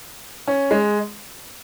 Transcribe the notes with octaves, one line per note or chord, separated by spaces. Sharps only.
C#4
G#3